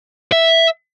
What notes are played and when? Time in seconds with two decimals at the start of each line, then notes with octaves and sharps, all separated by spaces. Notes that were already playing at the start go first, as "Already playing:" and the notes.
0.32 E5